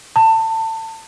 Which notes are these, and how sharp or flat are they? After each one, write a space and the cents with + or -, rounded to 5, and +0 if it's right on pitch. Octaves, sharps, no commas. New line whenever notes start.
A5 +25